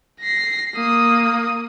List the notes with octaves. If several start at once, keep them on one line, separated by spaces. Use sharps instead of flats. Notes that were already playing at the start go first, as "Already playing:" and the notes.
A#6 C7
A#3 D#6